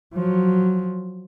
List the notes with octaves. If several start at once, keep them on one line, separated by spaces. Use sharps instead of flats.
F3 F#3